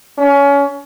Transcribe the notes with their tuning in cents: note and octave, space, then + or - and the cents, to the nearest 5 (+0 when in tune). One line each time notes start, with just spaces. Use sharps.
C#4 +25